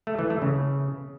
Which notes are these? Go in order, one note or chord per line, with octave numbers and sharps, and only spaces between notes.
A3
E3
A3
C#3